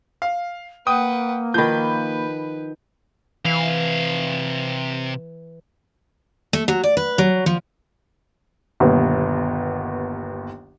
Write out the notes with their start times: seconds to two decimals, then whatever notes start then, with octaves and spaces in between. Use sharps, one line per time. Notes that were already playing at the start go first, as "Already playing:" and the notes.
0.22 F5
0.87 A#3 B4 F#5 G5 D#6
1.54 D#3 F3 B4 B5 G6
3.45 C3 E3 F5
6.53 A3
6.68 F#3
6.84 D5
6.97 B4
7.18 F#3
7.46 F3
8.80 G1 D#2 B2